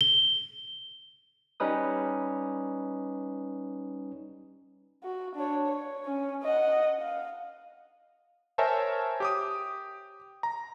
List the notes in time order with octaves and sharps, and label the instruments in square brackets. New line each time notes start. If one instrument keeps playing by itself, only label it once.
[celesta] G7
[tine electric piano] G3 C#4 D#4 B4 D#6
[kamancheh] F#4
D4 C#5
C#5
C#4
D#5 F#5
F5
[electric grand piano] A#4 C5 C#5 E5 G#5 A5
G4 D6 D#6
A#5